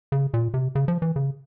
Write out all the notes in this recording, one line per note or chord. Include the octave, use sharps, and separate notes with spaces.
C#3
A#2
C3
C#3
F3
E3
C#3